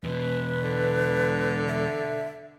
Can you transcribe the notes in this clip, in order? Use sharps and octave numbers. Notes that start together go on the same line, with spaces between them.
E2 B2 B4
D3
E5